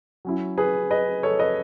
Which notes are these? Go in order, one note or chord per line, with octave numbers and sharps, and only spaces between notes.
F#3 C#4 E4
G#4 B4
B4 D#5
A4 C#5
B4 D#5